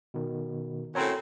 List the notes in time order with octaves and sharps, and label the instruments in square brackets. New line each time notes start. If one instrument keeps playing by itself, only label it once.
[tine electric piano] B2 D#3
[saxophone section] F#2 A2 C4 [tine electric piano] C#5 A#5 C6